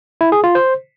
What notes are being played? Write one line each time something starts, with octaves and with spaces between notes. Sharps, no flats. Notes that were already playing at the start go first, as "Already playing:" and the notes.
E4
G#4
F4
C5